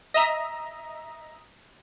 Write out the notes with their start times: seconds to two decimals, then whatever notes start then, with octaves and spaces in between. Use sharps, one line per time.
0.14 D#5 E5 A#5